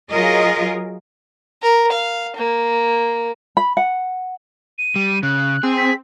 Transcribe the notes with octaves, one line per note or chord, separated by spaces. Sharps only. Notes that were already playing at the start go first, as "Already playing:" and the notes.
F#3 F4 G#4 A#4 D#5
A#4
F5
A#3
B5
F#5
D#7
G3
C#3 F#6
C4 G#4
B6